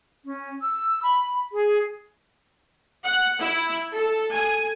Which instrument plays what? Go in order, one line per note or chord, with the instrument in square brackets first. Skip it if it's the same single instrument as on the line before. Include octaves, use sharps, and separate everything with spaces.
[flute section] C#4
E6
B5
G#4
[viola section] F#5
E4
A4
G#5